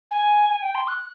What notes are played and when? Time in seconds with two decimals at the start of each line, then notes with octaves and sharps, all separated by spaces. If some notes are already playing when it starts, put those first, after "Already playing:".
0.11 G#5
0.49 G#5
0.62 G5
0.75 C6
0.88 F#6